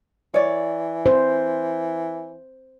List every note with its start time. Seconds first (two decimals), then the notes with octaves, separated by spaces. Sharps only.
0.34 E3 C#5 D5
1.06 C5